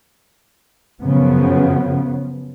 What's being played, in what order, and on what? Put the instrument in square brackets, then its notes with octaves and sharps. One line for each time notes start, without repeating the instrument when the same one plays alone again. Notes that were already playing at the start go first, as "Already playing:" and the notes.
[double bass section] F#2 C#3 F3 B3